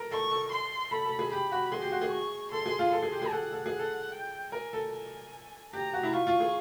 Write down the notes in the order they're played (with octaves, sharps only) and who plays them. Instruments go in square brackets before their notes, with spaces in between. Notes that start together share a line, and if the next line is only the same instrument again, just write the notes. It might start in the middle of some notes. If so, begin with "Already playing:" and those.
Already playing: [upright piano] A4 A#4
[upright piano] A4 [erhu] C#6
[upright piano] A4
[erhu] C6
[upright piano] A4 [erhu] B5
[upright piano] A4
G#4
[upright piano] G4 [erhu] B5
[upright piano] F#4
[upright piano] G#4 [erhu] C6
[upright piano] G4
F#4
G#4
[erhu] C#6
[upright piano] A4 [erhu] C6
[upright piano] G#4
F4
[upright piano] A4 [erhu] C6
[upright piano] G#4
G4
G#4
[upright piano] A4 [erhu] F#5
[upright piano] A4
G#4
[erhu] F#5
[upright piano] A4
[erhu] G5
[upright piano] A#4 [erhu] G#5
[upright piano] A4
[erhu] G#5
[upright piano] G4 [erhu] A#5
[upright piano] F#4
E4
[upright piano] F4 [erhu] C#6
[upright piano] F4
G#4